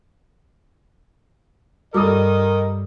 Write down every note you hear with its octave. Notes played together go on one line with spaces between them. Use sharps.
G2 G3 A4 A#4 D#5 D6 D#6